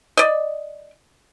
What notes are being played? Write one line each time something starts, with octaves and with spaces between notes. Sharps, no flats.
D5 D#5